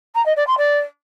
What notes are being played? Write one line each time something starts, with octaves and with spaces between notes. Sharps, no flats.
A#5
D#5
D5
C6
D5